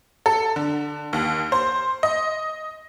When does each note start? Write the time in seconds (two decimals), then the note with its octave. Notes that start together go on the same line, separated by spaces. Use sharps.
0.26 A4
0.56 D3
1.13 D#2
1.52 C5
2.03 D#5